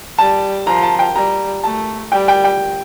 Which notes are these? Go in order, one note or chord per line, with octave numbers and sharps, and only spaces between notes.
G3 A5
F3 A#5
A5
G5
G3 A#5
A3 A5
G3 G5
G5
G5